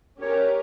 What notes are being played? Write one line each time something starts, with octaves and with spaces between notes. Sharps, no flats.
C#4 G4 A#4 C#5